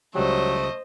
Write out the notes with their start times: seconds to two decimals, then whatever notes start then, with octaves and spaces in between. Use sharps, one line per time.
0.15 C#2 F#3 G3 A3 G4 C5 D#5